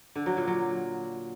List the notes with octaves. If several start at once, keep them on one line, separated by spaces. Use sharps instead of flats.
D3
F#3
A#2
F#3